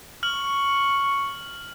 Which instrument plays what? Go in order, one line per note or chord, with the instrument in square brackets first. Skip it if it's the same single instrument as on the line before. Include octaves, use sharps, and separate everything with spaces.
[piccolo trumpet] C#6 [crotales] F6 F#7